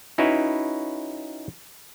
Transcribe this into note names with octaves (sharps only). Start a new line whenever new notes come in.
C#4 D#4 E4 F#4 B4 C#5